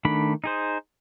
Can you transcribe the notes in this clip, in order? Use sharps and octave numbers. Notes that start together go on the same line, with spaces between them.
D#3 A3 D4 B5
D#4 G#4 C5